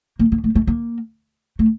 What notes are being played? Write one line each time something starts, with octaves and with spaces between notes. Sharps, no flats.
A#3
A#3
A3
A3
A#3
A3